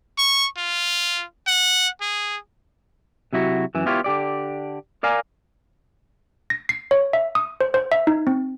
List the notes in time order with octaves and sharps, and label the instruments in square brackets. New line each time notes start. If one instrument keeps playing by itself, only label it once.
[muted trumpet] C#6
F4
F#5
G#4
[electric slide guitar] C3 F#3 E4 F#4
F#2 E3
B3 E4 F4 G4 C#5
D3 G4 D5
A#4 D5 F5 G#5 A#5
[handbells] A#6
C7
C#5
E5
D#6
C5
C5
E5
D#4
C4